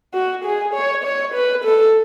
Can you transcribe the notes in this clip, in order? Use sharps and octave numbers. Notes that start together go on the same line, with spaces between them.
F#4
G#4
C#5
C#5
B4
A4